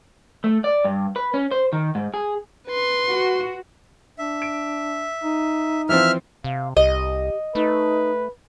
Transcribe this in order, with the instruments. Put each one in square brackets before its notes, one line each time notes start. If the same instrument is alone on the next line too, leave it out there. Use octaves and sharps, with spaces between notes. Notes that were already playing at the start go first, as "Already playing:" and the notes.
[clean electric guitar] A3
D5
G2
B4
C#4
C5
D#3
G#2
G#4
[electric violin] B4 C6
[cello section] F#4
[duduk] D4 [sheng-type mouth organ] E5
[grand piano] D7
[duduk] D#4
[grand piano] E3 F3 C4 [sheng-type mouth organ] E5 F6
[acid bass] C3 [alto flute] F5
[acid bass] C2 [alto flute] G4 [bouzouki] D#5
[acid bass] A3 [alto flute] D#4 [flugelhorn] B4